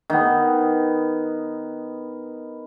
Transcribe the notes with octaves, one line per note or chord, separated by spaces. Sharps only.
D#3 B3